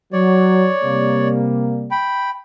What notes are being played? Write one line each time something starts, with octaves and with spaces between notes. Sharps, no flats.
F#3 C#5 D5
C3 G3 A#3
G5 B5